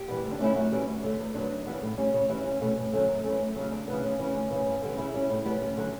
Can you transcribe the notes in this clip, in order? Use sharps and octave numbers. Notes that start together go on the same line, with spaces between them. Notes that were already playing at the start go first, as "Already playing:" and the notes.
Already playing: G4
E3 G3 B3
D2
D4
D3 A3 C#4 E4
F#2 F#4
E3 G3 C#4
D2
D3 A3
E2
D3 F#3 B3 D4
F#2
C#3 E3 G3 B3
A2
G3 C#4
C#3 C#5
E3 G3 C#4 E4
E2 C#4
B2 A3 C#4
G2
D3 F#3 A3 C#4
F#2
E3 A3 C#4
F#2
C#3 F#3
D2 D4
C#3 E3 B3
D2 C#4
C#3 E3 C#4
D2
C#3 E3
G2
D3 G3 B3
C#3 E4
G3 C#4
A2
G3 B3
D2 C#4
D3 F#3